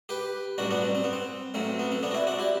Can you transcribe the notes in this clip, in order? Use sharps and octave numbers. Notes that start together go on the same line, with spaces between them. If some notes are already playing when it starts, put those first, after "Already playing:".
G4 B4
A1 G2 F#3 D4 F#4
B3 D4
C4
C4
B3
C4
A1 A2 F#3 C4
B3
C4
B3 D4
F#4
C4 E4
D4 F#4
E4 G4